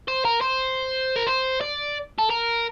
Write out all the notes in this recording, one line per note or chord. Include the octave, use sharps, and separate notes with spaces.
C5
A#4
C5
A#4
C5
D5
A4
A#4